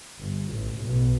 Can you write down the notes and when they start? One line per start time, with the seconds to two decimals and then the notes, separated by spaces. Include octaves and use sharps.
0.20 G1 G2
0.51 A1 A2
0.82 B1 B2